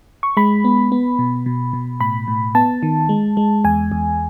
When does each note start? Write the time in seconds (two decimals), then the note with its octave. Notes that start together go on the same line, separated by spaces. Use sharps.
0.23 C#6
0.37 G#3 B5
0.65 B3
0.92 B3
1.19 B2
1.46 B2
1.73 B2
2.01 A2 B5
2.28 A2
2.55 B3 A5
2.83 D#3
3.09 G#3
3.37 G#3
3.64 E2 G#5
3.92 E2